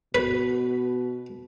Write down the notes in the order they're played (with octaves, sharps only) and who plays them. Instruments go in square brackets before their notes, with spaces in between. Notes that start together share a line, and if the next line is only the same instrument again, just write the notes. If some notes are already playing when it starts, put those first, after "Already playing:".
[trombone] B2 [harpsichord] B4